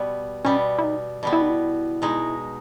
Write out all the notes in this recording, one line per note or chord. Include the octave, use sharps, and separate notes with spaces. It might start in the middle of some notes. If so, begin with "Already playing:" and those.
Already playing: B2 G3 B3
B2 G3 B3 C#4
E4
D#4
B2 G3 B3
E4
D#4
E4
B2 G#3 D#4